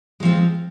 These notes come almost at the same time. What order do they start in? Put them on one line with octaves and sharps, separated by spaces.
G#3 F3 C4